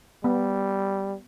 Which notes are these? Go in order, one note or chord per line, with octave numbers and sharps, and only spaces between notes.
G3 B3